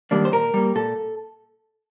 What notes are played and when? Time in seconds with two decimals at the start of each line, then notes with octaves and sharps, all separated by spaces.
0.11 D#3 G3 A#3 D4
0.25 C5
0.32 A#2 A#4
0.54 G3 A#3
0.75 A#2 A4